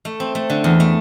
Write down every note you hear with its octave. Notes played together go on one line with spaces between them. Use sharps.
A3
C4
A3
D3
E2
A3